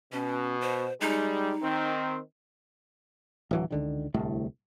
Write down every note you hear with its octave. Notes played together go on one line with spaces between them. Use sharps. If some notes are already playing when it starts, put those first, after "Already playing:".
B2 C#4
C5
G3 G#3 D#4
D#3 C4
D1 E3 F#3
C#2 D3 D#3
D1 C2 A2 A3